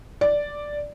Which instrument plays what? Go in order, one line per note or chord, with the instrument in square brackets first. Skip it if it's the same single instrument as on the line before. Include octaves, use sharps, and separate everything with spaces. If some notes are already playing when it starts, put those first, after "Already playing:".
[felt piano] D5